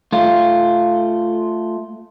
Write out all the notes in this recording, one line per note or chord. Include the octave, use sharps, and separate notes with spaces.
A3 F4